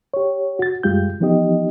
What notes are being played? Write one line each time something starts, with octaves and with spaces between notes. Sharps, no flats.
G4 C#5
F#4 A6
F#2 G3 G#3 F4 G4 G6
E3 F3 B3 D#4 G4 D#5